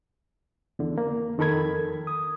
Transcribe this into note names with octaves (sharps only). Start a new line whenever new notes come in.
E2 D3
A#3
F2 D#3 A4 A#4 B5 G#6
D#6